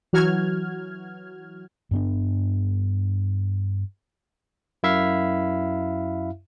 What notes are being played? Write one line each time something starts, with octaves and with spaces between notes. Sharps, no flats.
E3 F#3 F#4 F6 G#6
G2 B3 D4
F#2 E4 E5 F5